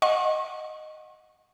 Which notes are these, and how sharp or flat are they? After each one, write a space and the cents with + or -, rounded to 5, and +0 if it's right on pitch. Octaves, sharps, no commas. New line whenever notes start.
D#5 -5 F#5 -20 C#6 -40